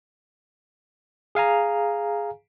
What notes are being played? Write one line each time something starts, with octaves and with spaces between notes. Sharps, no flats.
G#4 F5 G#5 A#5